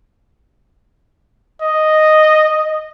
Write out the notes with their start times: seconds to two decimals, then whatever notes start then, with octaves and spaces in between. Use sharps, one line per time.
1.62 D#5